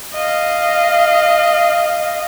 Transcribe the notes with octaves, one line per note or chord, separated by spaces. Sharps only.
D#5 F5